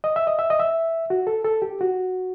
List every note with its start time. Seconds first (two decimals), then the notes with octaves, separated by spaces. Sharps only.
0.04 D#5
0.16 E5
0.27 D#5
0.39 E5
0.50 D#5
0.59 E5
1.10 F#4
1.27 A4
1.45 A4
1.62 G4
1.81 F#4